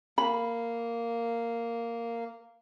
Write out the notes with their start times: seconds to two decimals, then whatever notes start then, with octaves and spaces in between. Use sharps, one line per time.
0.18 A#3 B5